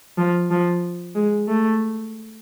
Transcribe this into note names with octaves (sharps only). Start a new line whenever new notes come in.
F3
F3
G#3
A3